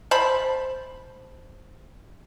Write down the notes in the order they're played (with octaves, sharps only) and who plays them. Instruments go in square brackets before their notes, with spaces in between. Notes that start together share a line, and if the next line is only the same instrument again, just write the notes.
[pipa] C5 A5 B5